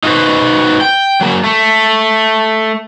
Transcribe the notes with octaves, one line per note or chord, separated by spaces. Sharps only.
D#4 F4 F#4 G#4 B4 C5
G5
F#3 A#3
A3